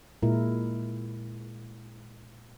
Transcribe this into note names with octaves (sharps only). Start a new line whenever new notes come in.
A#2 G#3 E4 A#4